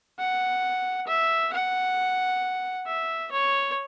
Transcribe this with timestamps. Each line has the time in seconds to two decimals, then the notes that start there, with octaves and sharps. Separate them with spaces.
0.19 F#5
1.08 E5
1.53 F#5
2.87 E5
3.32 C#5